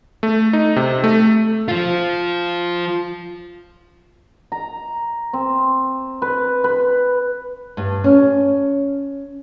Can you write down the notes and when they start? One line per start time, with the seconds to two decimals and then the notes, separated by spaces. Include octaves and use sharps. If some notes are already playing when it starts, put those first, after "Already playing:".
0.23 A3
0.53 D#4
0.76 C3
1.04 A3
1.68 F3 F4
4.52 A#5
5.33 C4
6.22 B4
6.64 B4
7.77 G2
8.04 C#4